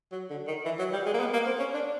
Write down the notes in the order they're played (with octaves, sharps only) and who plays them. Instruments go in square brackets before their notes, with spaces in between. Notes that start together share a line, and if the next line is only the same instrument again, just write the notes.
[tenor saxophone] F#3
D3
D#3
E3
F#3
G3
G#3
A#3
B3
A#3
C4
C#4
D4